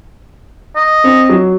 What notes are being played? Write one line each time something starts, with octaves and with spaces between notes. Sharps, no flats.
D#5
C4
F#3